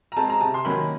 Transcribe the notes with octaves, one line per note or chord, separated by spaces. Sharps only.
A#5
G#3 C4 A5
A#5
C3 A5
C6
D#3 F#3 A#3 C#4 B5